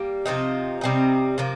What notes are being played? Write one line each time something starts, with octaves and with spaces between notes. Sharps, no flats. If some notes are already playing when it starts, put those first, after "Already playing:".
Already playing: G3 A#3
C3 F3 C4 D#4
C3 G3 C4 D#4
C3 F3 A#3